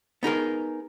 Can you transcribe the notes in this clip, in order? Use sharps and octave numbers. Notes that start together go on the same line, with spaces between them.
B3 D#4 G#4 A#4